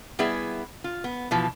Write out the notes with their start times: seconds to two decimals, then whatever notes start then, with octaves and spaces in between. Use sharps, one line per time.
0.19 G3 B3 E4 G#4 E5
0.84 F4
1.04 B3
1.31 B2 E3 F3